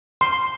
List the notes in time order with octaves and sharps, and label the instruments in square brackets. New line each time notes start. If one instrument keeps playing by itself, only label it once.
[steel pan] C6